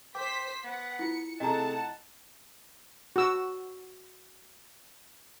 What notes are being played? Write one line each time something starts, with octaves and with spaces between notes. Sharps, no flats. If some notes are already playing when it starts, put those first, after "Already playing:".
C5 G5 D6 B6
B3 F#5
E4 F4 C#7
C3 A3 G#4 D#5 F#5 A5 A#5
F#4 E6